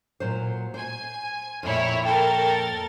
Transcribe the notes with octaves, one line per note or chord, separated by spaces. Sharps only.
A#2 F#3 C5
C5 G#5
F2 A#2 E4 C#5
A4 A#4 G5 A6